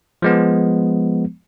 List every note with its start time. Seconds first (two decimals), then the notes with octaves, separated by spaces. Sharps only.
0.22 F3 G#3 B3